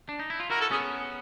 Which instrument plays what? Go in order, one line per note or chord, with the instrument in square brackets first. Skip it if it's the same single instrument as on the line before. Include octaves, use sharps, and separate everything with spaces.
[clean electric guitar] D4
D#4
E4
F4
[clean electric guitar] E4 F#4 [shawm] A#4
[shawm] A4
[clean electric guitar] B3 C#4 [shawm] G#4